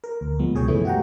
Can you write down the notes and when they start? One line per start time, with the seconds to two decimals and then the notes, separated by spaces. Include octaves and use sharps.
0.04 A#4
0.21 D2
0.39 F3 G#3 B3
0.54 C#2 B2 G#4 C#5 G5
0.68 F#2 E3 G#3 A3 E4
0.85 F#4 G4 F#5 G5 A#5